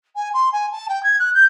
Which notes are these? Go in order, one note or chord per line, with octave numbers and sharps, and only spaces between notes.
G#5
C6
G#5
A5
G5
G#6
F#6
G6